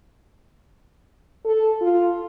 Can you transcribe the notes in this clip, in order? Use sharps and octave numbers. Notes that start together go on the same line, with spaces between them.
A4
F4